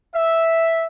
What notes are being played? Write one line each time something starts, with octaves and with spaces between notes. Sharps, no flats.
E5